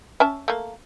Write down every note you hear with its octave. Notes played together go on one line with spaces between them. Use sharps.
C#4 E5 A5
A3 A#3